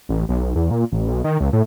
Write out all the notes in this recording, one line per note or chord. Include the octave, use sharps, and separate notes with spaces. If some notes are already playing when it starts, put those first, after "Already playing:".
A1
B1
E2
A#2
A1
B1
D#3
C#2
A2